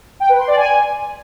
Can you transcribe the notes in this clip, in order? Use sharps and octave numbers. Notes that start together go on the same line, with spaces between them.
G5
B4
C6
D5
G#5